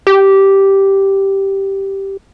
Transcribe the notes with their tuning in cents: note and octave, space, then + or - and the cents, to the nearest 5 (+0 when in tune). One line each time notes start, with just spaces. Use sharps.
G4 -5